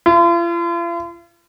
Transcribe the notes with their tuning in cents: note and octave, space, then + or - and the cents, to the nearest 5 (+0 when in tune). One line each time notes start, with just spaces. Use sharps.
F4 -45